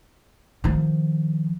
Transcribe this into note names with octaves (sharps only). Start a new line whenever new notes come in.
D#3 F3